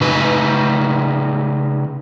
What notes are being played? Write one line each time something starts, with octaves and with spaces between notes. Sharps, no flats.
C#3 D#4 B4